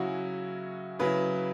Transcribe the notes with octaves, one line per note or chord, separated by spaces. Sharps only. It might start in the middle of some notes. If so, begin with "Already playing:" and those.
Already playing: C#3 F#3 C#4 E4 F#4
C#3 F#3 E4 B4